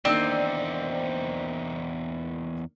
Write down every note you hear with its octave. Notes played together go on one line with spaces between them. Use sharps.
E2 D#3 A#3 C4 D4 D#4 D5 E6